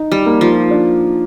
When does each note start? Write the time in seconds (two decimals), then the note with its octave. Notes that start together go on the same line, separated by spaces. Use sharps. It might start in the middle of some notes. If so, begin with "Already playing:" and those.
Already playing: D#4
0.12 G3
0.26 A#3
0.41 F3
0.71 D4